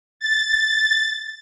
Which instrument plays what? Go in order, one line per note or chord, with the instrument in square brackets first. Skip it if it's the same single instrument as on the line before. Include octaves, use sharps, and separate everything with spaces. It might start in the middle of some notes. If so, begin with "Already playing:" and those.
[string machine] A6